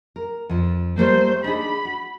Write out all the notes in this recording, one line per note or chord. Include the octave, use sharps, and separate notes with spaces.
A#4
F2 F3
G3 A3 A#3 C5
D4 D#4 G#4 B5
F#4